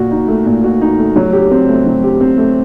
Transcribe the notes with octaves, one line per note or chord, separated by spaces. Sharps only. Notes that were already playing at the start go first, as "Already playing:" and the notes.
Already playing: A#2 F#4
D#4
A3
A#2
F#4
D#4
A3
F#3
G4
C4
A3
F#3
G4
C4
A3